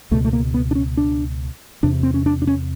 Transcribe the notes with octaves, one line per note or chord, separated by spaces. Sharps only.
C#2 B2 A3
A3
A#3
B3
D4
C#4
D4
E2 C3 D4
C4
C#4
D4
D4
C#4